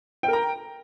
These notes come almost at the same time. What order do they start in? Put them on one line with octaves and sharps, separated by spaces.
G5 A#4 A#5